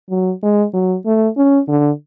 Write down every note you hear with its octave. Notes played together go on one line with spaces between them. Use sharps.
F#3
G#3
F#3
A3
C#4
D3